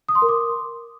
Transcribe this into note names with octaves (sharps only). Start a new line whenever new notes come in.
D#6
C6
A#4
D6